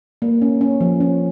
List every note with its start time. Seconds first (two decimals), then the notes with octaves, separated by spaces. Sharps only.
0.22 A#3
0.42 C#4
0.61 C#4
0.81 F3
1.00 C#4